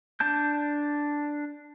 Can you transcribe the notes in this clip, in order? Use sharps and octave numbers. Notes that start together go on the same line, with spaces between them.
D4 A5 G6